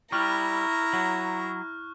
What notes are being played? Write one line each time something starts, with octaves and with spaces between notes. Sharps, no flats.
G3 E4 A#5 C#6 F6 F#6
F#3